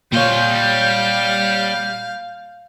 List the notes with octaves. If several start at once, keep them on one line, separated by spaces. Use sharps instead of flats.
A#2 G3 C#5 F5 C6 G6